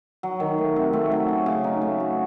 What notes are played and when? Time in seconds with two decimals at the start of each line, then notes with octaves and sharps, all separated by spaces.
0.23 F#3
0.40 D#3
0.58 A3
0.76 C3
0.93 A3
1.12 F#3
1.28 C#4
1.46 C#3
1.64 D#4
1.81 A3
2.00 F#4